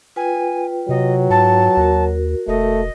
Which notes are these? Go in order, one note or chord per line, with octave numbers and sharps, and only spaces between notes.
F4 B4 G5 G#5
C3 F#3 D#5
G#2 A5
D#2 F#4 A#4
E1 A3 D#5